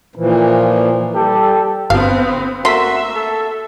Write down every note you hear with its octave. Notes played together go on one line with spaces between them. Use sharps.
A#2 E3 F3
G3 G4 A4
G1 B3 C4 F5
A3 A#3 F#4 E5 C6 B6
A4